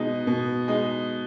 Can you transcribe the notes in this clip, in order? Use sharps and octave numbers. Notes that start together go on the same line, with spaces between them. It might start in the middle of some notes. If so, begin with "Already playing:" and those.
Already playing: B2 G#3 D#4
B2
G#3 D#4